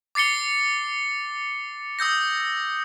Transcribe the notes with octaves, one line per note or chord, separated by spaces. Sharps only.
D6 A6 C7 C#7 G7
D#6 E6 G6 A#6